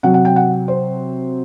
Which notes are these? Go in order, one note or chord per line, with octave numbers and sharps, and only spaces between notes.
C3 F#3 F#5
F#5
G5
F#5
C5